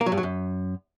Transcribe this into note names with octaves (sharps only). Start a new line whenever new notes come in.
A#3
F#3
G2
F#3
F#2